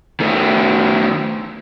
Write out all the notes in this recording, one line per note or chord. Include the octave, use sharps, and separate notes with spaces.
D#3 A3